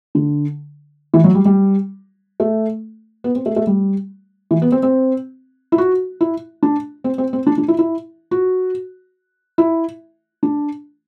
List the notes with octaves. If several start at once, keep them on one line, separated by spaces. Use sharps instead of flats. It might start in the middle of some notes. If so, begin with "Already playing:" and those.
D3
E3
F#3
G3
G3
A3
B3
C4
A3
A3
G3
E3
B3
C4
C4
E4
F#4
E4
D4
C4
C4
C4
D4
D4
E4
E4
F#4
E4
D4